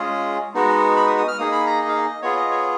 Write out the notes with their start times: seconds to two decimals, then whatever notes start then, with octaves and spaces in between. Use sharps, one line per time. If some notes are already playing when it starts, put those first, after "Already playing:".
Already playing: G#3 C#4 F4 G#4
0.54 G#3 B3 D#4 F#4
0.96 B5
1.07 D#6
1.18 D#6
1.28 F6
1.38 A#3 D#4 G#4 D#6
1.52 B5
1.66 A#5
1.81 D#5
1.88 F5
1.95 D#5
2.22 B3 F4 G#4 C#5
2.37 D#5
2.51 C#5